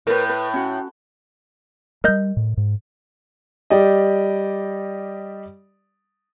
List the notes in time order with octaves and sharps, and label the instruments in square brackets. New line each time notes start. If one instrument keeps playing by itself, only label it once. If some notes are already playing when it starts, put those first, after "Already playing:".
[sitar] A2 [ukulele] A#4 B4
[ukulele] B4
C#4 F#4
[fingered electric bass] G3 A3 [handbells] A#4 D#5 G6
[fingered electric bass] A2
G#2
[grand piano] G3 G4 D5 D#5